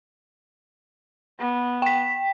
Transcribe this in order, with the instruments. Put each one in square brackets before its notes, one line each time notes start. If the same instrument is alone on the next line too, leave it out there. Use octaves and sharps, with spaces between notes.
[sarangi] B3
[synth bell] G5 B6